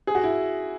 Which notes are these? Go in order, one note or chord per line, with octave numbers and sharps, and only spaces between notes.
G#4
F#4
E4